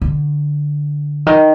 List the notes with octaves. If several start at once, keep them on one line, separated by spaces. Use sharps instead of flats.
D3
D#3